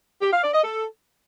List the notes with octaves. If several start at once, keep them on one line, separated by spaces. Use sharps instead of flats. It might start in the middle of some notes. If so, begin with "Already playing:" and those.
G4
F5
D5
D#5
A4